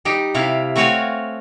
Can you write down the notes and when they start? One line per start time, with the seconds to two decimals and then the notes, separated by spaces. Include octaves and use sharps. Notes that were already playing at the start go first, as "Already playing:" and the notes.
0.05 G3 D#4 G4
0.35 C3 E4 F5
0.76 A3 C4 F#4 C#5 F5 G#5